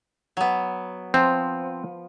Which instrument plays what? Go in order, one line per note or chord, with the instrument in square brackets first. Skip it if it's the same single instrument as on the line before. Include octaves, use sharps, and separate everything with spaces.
[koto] F#3 B3
[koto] F3 [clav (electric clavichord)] C4